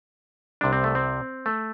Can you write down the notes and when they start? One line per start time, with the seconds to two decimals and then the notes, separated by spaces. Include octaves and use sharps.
0.61 C2 C3 G3 D4
0.72 C4
0.84 A3
0.95 C4
1.46 A3